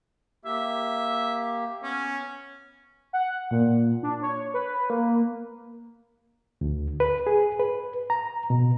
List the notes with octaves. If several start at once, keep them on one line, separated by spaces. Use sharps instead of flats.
A#3 G4 E5
B3 C#4
F#5
A#2
D4
C#5
B4
A#3
D2
B4
G#4
B4
A#5
B2